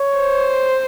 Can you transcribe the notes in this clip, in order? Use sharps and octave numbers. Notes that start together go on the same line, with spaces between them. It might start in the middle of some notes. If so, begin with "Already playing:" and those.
Already playing: C#5
C5